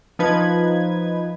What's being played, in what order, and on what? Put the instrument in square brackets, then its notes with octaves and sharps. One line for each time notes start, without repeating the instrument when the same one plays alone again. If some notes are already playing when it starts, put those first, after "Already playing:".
[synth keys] F3 D#4 B4 G#6